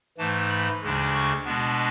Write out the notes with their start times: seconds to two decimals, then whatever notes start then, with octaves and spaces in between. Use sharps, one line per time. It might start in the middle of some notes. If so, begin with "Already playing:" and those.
0.18 G#2 E3 A3 A5
0.50 B5
0.82 D2 C#3 G#3 D4
1.13 C#6
1.45 B2 G#3 B3 D4